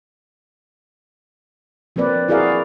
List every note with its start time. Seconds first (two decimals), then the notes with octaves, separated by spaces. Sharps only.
1.96 F3 A#3 C4 B4 D5
2.28 E4 F#4 G#4 A#4 D5 F5